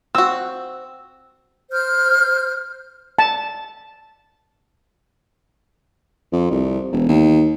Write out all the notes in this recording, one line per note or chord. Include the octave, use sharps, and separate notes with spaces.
C4 F#4 E6
C5 F6 G6
A5
F2
C2
E1
D#2